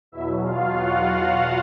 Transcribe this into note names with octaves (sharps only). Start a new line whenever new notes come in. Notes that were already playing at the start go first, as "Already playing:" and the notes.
E2 B2 F#3 E4 E5
F4 F5
F#4 F#5
F4 F5